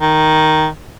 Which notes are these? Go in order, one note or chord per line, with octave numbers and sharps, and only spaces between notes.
D#3